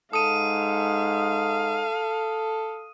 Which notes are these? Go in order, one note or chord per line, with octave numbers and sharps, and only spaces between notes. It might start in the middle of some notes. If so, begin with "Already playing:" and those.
G#2 A4 F5 D#6 D#7